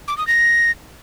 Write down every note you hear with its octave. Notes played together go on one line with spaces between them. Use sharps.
D6
D#6
A#6